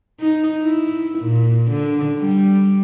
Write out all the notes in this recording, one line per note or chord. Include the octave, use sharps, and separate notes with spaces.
D#4
E4
A#2
D3
G3